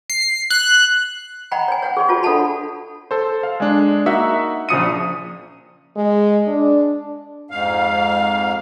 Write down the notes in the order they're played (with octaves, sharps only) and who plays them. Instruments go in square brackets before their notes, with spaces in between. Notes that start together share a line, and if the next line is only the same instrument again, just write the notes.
[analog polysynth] C7
F#6
[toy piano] D5 D#5 F#5 G5 A#5 B5
C#5 G#5
C#5 F#5 G5
G#4 D5 C6
F4 F#4 C#5 A5
D4 A4 D#5 F#5 A5 B5
[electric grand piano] A4 C5
F5
G#3 D4
A#3 D#4 F#4 E5 F#5
A#1 C#3 F3 D#6 C#7 D#7
[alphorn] G#3
D4
[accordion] F2 G#2 F5